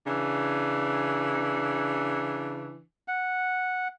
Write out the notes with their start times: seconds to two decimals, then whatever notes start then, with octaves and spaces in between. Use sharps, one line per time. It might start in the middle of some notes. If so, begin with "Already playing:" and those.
0.07 C#3 E3 D4
3.08 F#5